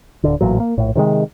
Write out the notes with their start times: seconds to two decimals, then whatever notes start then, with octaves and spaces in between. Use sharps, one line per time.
0.24 D1 D3
0.41 A1 A#2 F#3
0.60 A#3
0.78 A#1 A2
0.95 C3 D#3 G3 G#3